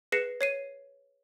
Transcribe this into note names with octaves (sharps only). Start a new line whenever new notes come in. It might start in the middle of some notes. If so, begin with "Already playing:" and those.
G#4 B4 A#6 C7 C#7 E7
C#5 C7 D#7